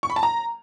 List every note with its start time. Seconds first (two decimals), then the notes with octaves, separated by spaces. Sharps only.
0.03 C#6
0.10 B5
0.16 A5
0.23 A#5